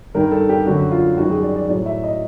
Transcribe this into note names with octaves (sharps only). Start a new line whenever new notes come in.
G2 D#3 G3 A#4
A4
G4
F#2 D3 F#3 F#4
F4
F#2 D#3 G3 F#4
G#4
D5
D5
A2 F#3 D5
E5
D#5